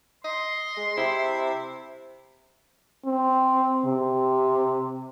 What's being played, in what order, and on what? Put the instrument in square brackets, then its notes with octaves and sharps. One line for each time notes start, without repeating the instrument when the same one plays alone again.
[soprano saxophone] D#5 [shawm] C6
[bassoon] G#3
[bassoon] C3 [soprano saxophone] E4
[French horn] C4
C3